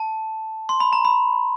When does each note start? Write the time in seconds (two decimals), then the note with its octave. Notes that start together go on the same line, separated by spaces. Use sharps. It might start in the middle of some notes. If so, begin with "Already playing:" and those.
Already playing: A5
0.69 C6
0.80 B5
0.93 A#5
1.05 B5